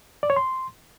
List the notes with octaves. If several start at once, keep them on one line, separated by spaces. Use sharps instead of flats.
D5
C#5
C6